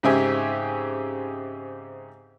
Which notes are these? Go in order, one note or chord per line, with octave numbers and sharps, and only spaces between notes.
G#2 C#3 C4 G4 E5 G#5